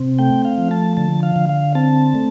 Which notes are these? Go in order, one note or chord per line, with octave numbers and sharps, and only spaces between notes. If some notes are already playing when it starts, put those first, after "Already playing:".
Already playing: C3 C4
A3 G5
F5
F3
A5
D3 A5
F5
D3
F5
C4 A5
A3